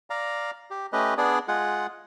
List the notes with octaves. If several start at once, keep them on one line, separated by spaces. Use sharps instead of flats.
D5 F5 A#5
G4
A3 C#4 G4 B4 D#5
B3 D4 G#4 D5
G#3 F4 G#4 F#5